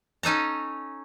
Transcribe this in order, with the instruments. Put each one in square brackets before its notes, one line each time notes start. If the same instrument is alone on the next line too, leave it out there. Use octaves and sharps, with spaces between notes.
[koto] C#4 D#4 A4 A#5